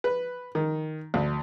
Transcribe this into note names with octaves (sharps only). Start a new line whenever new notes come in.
B4
D#3
D2